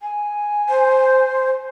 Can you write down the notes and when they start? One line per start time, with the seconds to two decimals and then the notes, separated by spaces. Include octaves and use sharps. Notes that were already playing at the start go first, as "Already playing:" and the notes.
0.01 G#5
0.69 C5